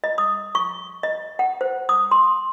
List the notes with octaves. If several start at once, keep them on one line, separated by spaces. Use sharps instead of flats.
D#5
D#6
C#6
D#5
F#5
C5
D#6
C6